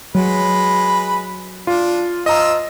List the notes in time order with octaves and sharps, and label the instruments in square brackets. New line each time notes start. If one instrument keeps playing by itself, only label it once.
[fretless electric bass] F#3 [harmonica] G#3 B4 B5
[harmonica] D4 [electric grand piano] F4
[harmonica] F3 F4 E6 [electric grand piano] D#5 A#5